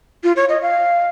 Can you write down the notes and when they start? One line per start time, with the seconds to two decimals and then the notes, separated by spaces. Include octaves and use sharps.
0.24 F4
0.36 C#5
0.49 D#5
0.62 F5